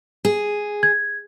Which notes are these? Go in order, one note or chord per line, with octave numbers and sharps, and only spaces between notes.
G#4
G#6